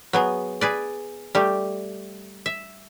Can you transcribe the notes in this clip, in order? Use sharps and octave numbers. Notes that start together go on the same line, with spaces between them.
F#3 B3 G#4
G#4 B4 D5
G3 A3 G4
E5